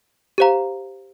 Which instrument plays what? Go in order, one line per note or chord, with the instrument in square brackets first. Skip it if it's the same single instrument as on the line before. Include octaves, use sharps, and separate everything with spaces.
[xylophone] G4 C5 F5 A#5